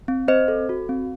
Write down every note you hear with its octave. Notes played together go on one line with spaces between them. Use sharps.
C4
C4 C5 D#5
A4
F#4
C4